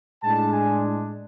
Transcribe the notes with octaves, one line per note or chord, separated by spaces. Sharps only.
A2 G#3 D4 A5
G#5